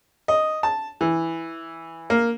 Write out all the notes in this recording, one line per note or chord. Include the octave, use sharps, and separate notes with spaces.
D#5
A5
E3
A#3